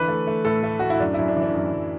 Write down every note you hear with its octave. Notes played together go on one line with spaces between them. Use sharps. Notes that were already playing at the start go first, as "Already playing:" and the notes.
Already playing: D3 E3 B4
A3
A3
A2 A4
A3
A2 F#4
E4
F#2 D4
F#2 E4
D4
E3
D4
F#2
F#2